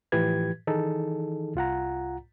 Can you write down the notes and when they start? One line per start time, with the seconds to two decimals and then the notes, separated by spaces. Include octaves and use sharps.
0.12 A2 E3 F3 G4 B4 G#6
0.67 D#3 E3 D#4 G#4 A4
1.55 C2 F4 F#5 A#5